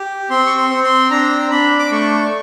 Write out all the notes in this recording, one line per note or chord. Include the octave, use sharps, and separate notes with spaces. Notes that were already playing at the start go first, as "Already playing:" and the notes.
Already playing: G4
C4 C6
C#6
C6
C4
C6
D4 A#5
D4 B5
D6
A3 C#6